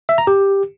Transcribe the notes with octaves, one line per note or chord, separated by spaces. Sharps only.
E5
A#5
G4